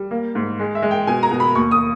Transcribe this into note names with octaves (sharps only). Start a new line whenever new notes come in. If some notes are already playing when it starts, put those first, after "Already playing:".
Already playing: G3
A#3
G#2
G#3
E5
G#3
G5
B2 G#5
A#5
B2
B5
D#2 C#6
D#6